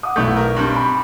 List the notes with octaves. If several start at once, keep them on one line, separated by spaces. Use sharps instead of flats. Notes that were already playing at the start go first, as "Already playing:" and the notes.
F#5 D6 D#6
B1 A3 B3 E4 C#6 G6
A#4
G2 C4
B5